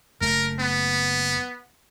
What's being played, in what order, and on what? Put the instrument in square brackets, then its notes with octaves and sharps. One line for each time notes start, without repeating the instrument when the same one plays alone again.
[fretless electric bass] F#1 A3 [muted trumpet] A#4
[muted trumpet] B3